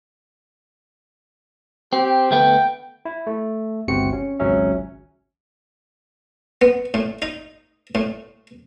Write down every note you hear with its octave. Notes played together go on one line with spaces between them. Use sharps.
C4 G4
D2 A3 B3 G5
E4
A3
G1 C#2 C3 C4 F#4 C#7
C#4
G#1 C#2 F#3 C#4 E5
B3
A2
D#4
A2